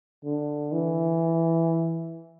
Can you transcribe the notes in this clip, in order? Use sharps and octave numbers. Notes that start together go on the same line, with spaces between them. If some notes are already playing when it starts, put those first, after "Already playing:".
D3
E3